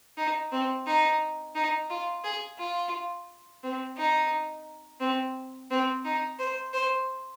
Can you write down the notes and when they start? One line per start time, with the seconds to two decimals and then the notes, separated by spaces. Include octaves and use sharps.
0.17 D#4
0.52 C4
0.86 D#4
1.55 D#4
1.90 F4
2.24 G#4
2.58 F4
3.63 C4
3.97 D#4
5.01 C4
5.71 C4
6.05 D#4
6.39 C5
6.73 C5